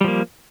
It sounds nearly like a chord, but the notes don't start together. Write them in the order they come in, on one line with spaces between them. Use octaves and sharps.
G3 F3 A#3